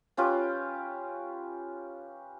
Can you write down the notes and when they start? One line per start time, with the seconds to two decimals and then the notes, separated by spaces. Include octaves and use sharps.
0.17 C#4 F4 G4 B4